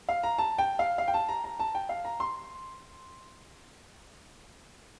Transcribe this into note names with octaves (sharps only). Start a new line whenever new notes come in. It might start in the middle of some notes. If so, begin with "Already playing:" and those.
F5
A#5
A5
G5
F5
F5
G5
A5
A#5
A#5
A5
G5
F5
A#5
C6